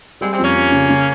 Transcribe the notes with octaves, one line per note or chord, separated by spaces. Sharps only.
G3 G#3 C4
G#3 C4
F2
A#3 C#4
F2
C#3
C#3